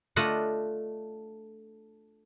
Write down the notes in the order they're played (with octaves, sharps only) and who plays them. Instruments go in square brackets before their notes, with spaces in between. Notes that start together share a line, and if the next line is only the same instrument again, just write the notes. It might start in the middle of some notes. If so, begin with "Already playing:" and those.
[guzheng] A3 D4 F4 D#5 F#5